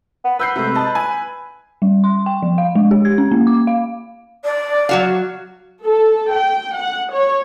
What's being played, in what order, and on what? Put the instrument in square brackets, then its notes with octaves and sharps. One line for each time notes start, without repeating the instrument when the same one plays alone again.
[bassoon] B3
[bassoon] B4 [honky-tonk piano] E6 G6 C7
[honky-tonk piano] C3 G#3 A3
D#5 A5
G#5
[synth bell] G3
C6
G5
F3
F5
G#3
G4
G#6
C#4
A#3
D6
F5
[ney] D5
[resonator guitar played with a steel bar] F#3 F#4 F5
[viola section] A4
G5
F#5
C#5